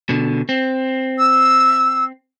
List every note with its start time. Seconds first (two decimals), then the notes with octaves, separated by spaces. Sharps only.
0.09 B2 D3
0.49 C4
1.19 E6